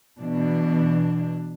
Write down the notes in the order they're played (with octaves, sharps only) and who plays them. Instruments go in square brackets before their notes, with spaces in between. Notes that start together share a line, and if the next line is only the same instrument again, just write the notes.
[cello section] B2 E3 D4